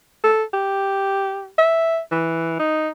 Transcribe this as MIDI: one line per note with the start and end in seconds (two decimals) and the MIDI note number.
0.23 0.43 69
0.53 1.49 67
1.58 1.99 76
2.12 2.56 52
2.59 2.89 63